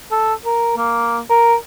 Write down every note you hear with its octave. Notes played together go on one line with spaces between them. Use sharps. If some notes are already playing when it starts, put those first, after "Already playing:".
A4
A#4
A#3
A#4